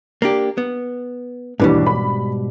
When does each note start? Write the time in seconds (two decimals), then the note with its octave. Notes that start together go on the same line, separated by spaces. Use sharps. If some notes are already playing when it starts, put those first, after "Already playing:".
0.22 A#3 D4 G4
0.58 B3
1.60 D#2 G#2 B2 E3 G3 D4
1.87 B5